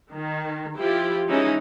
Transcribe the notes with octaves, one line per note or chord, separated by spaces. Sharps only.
D#3
F3 E4 F4 G4
E3 G#3 C#4 D#4 E4